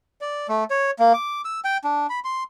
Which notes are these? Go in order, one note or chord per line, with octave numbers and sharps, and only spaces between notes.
D5
A3
C#5
A#3
D6
E6
G5
D4
B5
C6